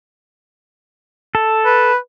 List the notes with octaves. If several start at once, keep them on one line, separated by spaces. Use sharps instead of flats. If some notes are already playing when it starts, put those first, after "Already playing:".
A4
B4